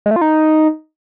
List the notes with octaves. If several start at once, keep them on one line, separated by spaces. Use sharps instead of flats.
G#3
A3
F4
D#4